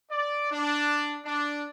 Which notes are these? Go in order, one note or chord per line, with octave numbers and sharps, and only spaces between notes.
D5
D4
D4